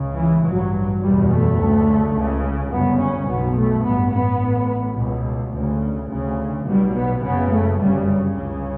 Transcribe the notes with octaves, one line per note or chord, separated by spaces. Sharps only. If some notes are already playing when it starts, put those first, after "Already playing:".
Already playing: C#2 C#3
E3
A1 G2 F#3
F#1 E2 B2 G3
A3
D2 C#3
C#2 C#3
G1 F#2 C#3 B3
C#4
B1 B2 B3
A3
A1 G2 B3
B3
A1 A2
C#2 B2
D2 C#3
D2 C#3
B1 B2 G3
B3
F#1 F#2 C#3 B3
A3
G1 F#2 C#3 G3
C#2 C#3